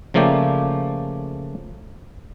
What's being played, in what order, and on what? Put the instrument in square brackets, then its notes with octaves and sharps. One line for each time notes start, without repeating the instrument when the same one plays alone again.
[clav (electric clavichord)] C#3 F3 A3 A#3 D5 G5